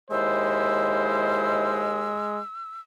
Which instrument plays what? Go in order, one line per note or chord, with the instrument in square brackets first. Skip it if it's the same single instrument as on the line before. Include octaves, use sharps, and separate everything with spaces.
[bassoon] D#2 [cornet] G#3 [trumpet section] E4 C5 [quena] E6